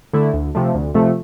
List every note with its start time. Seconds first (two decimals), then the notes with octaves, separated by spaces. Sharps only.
0.13 D3 A3 E4
0.33 D2
0.55 C3 F3 A3
0.74 D2
0.95 C3 F3 A3